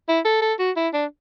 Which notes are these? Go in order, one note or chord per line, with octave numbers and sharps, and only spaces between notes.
E4
A4
A4
F#4
E4
D4